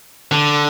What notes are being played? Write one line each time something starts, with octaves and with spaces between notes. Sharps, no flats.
D3